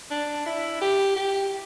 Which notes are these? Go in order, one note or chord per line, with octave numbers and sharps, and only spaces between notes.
D4
E4
G4
G4